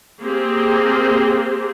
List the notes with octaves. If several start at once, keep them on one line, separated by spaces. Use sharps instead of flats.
A#3 C4 G4 G#4